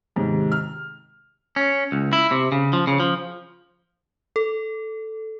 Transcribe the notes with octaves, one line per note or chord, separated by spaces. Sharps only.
D#2 G#2 C3
F6
C#4
C#2
E4
C3
C#3
F3
C#3
F3
A4